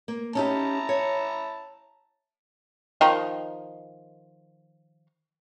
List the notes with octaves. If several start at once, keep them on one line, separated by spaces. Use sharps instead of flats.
A#3
C#4 D#4 E4 G4 A5 A#5
C#5
D#3 F3 D#4